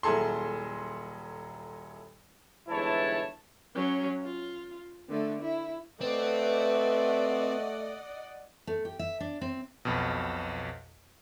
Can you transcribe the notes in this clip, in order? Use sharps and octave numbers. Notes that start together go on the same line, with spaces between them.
D#1 F#3 E4 G#4 A4 C6
G1 G#2 E3 E4 C#5 A5
F#3 C#4
F4
D3 A3
E4
A3 C4 B4 D5 D#5 F#5
A3
G4
E5
D4
C4
B1 F2 B2